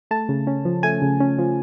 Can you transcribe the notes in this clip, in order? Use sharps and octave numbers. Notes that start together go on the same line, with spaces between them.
A3 A5
C#3
C#4
F3
A3 G#5
C#3
C#4
F3